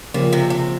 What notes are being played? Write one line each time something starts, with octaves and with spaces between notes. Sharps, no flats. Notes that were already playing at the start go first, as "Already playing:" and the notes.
A#2 C#3 F3 A#3 C#4 G4
C3
C3